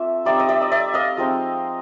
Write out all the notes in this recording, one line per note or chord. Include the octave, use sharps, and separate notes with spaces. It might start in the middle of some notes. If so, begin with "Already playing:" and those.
Already playing: A3 C4 F4 D5 E5
G3 C4 D#4 D5 E5
D#5
D5 E5
D#5
D5 E5
D#5 F5
F3 G#3 C4 D#4